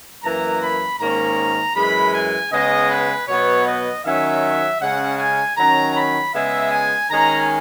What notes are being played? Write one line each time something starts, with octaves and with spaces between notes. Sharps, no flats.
F#2 E3 A#3 A#5
B5
G#2 D#3 A#3 C#4 A#5
F#2 E3 G#3 B5
G#5
C#3 G#3 B3 D#5
B4
B2 F#3 B3 C#5
D#5
D#3 F#3 C#4 E5
C#3 G#3 C#4 F#5
G#5
D#3 F#3 C#4 A#5
B5
C#3 G#3 B3 E5
G#5
D#3 G#3 C#4 A#5